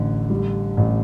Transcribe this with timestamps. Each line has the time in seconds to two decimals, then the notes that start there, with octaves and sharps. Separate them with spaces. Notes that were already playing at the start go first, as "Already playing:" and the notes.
Already playing: A1 D3
0.30 G3
0.77 A1